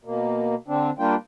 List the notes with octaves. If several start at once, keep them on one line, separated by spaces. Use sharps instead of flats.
B2 A#3
D3 C4 D4
G3 A#3 D4 F4 G5